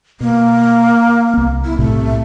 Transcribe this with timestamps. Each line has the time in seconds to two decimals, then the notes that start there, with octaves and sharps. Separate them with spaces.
0.21 B2 A#3
1.34 C2 B3
1.65 E4
1.79 B1 A2 C3 A3